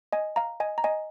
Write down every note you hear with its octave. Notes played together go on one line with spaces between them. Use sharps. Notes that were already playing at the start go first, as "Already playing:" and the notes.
D#5 G#5
F5 A#5
D#5 G#5
A#5
D#5 G#5